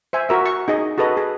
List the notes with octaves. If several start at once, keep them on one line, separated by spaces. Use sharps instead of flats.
C5 E5 G#5
F#4 A#4 E5
C#6
D#4 G#4 D#5
F#4 G#4 A4 B4 D#5
G#4